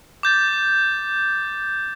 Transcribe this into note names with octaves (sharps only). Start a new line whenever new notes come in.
D6 G6 A6